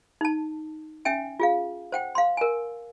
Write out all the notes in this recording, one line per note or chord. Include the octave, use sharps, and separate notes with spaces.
D#4 A5
C#4 E5 G5 G#5
F4 G#4 F5
C5 F#5 G5
F5 C6
A#4 G#5